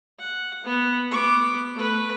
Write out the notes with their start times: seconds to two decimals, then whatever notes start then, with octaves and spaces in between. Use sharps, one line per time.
0.19 F#5
0.65 B3
1.11 B3 D6
1.75 A3 B4